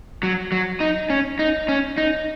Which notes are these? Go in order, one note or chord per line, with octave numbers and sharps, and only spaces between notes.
F#3
F#3
D#4
C#4
D#4
C#4
D#4